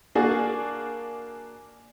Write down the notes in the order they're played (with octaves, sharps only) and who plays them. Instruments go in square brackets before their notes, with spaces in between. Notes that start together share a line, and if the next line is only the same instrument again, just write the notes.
[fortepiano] A#3 D4 F#4 G#4